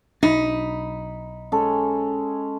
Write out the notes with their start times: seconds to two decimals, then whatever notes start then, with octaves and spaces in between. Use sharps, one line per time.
0.23 B1 F#3 D4 D#4 B5
1.52 G#3 C#4 A4